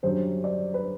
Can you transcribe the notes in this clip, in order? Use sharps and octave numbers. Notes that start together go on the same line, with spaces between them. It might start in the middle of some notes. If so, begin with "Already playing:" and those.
F#2 D3 G3 C5
D5
B4